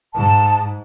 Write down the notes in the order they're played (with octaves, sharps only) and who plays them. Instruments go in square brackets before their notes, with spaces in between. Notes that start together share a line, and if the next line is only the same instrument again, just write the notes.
[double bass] G#2 [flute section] A5